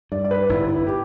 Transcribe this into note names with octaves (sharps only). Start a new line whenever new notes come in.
G2 D5
D5
B4
G1 E4
E4
G4